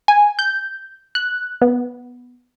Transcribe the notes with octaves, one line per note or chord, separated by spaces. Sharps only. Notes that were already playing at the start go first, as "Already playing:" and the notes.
G#5
G6
F#6
B3